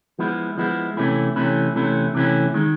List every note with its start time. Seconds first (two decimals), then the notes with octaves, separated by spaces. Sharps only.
0.19 F3 G#3 B3 E4
0.58 F3 G#3 B3 E4
0.97 C3 E3 A3 C#4 E4
1.36 C3 E3 A3 C#4 E4
1.76 C3 E3 A3 C#4 E4
2.15 C3 E3 A3 C#4 E4
2.54 D#3 G#3